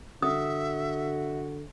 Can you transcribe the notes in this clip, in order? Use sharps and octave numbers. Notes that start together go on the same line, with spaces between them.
D3 F#4 E5 D#6